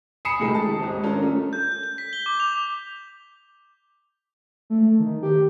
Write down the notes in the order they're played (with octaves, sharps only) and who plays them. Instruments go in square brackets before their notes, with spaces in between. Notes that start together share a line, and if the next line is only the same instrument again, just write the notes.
[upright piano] G#5 B5 D#6 C7 C#7 E7
A2 C3 D#3 G#3 A3
A5
D#1 G#2
C#4 D4 F4 A4 A#4
A3
[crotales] G6
G6
G6
B6
G7
D6
F7
[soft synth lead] A3
D#3
G4